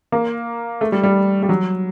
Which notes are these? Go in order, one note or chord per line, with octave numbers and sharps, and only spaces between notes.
A#3
A3
G3
G3
G3
F#3